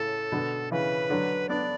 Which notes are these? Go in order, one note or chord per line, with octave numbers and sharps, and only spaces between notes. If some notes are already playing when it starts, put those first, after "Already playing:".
Already playing: A2 C#3 A4
B2 D3
C#3 E3 B4
D3 F#3
B3 D4 D5